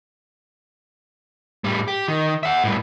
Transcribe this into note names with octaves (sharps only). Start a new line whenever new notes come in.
A2 G3
G4
D#3
E5 F#5
A2 G3